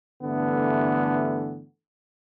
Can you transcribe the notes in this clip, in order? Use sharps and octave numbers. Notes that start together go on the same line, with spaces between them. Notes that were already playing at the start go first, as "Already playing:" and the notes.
G2 D3 E3 A3 B3